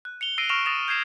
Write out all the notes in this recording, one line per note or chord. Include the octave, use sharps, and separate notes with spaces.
F#6
C#7 F7 G7
E6 A#6 C7 D7 D#7 G7
C#6 F6 A#6 D7 E7 F7
D#6 A6 A#6 E7 F7
G6 G#6 C7 E7 G7